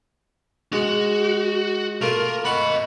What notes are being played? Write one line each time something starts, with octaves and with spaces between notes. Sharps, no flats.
G#3 F#4
A3 A#3 F4 A#4
D#5 F#5 B5 C#6